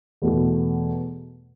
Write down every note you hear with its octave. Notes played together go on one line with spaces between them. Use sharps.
E2 B2 A3